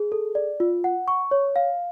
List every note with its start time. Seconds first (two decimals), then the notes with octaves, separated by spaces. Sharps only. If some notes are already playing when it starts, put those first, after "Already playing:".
Already playing: G#4
0.12 A4
0.35 D5
0.60 F4
0.84 F#5
1.08 C#6
1.31 C#5
1.56 F5